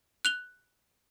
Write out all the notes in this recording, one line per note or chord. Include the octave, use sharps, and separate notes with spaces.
F#6 F7 G7